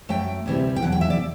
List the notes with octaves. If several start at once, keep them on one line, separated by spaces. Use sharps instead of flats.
F#2 F#3 A3 G5
D2 C3 E3 G3
G5
E2 B2 F#3 F#5
G5
E5
D5